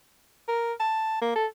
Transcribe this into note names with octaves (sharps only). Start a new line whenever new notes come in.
A#4
A5
A#3
A4